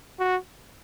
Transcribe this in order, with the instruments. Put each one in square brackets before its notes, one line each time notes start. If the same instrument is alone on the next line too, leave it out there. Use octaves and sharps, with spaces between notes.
[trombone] F#4